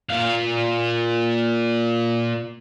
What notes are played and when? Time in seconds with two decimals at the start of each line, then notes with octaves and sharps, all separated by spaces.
0.09 A#2 F5